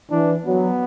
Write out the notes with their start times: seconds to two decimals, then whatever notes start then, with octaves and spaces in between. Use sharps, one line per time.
0.10 E3 D4
0.45 F#3 B3